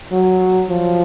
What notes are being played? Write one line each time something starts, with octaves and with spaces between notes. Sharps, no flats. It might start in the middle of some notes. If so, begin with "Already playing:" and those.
F#3
F3